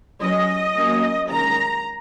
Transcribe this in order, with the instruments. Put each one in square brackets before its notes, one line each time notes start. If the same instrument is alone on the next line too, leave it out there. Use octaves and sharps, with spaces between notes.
[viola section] F#3 C#4 D#5
F#3 A#3 C#4
D#3 G#3 C#4 A#5